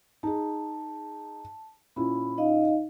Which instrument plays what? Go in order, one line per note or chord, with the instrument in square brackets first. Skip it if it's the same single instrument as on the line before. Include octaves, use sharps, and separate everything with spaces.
[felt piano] D#4 G#4 [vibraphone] A5
[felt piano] A#2 C#4 E4 [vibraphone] B5
[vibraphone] D#4 D#5 F5